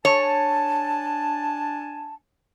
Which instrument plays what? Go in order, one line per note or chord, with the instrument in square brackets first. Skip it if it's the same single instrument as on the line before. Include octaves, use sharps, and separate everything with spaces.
[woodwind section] D4 G#5 A5 [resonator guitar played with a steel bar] C#5